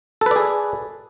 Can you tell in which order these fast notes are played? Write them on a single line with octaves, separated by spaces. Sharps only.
A4 B4 D5 G#4